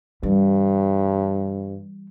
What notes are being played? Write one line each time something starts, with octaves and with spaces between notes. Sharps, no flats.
G2 E3 G3